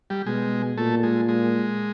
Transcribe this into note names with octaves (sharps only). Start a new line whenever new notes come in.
G3
B2 G#3
A#2 A3
G#3
G#3